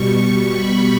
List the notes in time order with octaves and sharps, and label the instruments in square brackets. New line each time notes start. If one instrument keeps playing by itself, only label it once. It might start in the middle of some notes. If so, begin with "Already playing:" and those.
Already playing: [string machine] B2 G3 C#6
B5